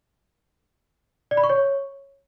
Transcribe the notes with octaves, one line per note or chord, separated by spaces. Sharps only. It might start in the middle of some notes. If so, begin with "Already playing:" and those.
D5
B5
C#6
C#5